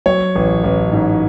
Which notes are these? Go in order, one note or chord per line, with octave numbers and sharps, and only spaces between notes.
F#3 C#5
A1
A1
G#2